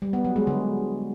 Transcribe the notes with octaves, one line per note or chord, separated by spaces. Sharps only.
G3
B3
F#3
G#3
D3